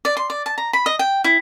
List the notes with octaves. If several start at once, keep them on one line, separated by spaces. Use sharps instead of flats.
D5
C6
D5
A5
A#5
B5
D#5
G5
E4